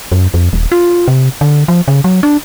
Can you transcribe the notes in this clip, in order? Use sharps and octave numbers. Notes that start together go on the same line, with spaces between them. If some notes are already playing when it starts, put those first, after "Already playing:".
F#2
F2
D#1
F4
C3
D3
F3
C#3
F#3
D4